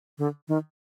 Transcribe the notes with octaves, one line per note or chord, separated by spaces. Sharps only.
D3
D#3